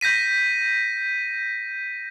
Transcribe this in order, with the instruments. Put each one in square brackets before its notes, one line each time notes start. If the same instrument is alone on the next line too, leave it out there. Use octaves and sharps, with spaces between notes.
[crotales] G6 A#6 B6 D#7